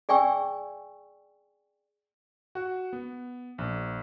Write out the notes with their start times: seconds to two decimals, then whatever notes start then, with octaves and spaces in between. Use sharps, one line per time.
0.09 G#4 D5 G5 G#5 C#6 E6
2.55 F#4 F#5
2.93 B3
3.58 A#1